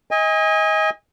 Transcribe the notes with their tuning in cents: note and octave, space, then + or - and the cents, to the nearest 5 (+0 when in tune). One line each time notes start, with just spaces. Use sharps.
D#5 +25 G#5 -25